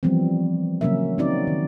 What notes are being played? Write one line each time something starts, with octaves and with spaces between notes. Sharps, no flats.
E3 F3 G3 B3 C4
C#3 F#3 A#3 C#4 A#4 E5
C4 C#4 D#4 F#4 D5
D#3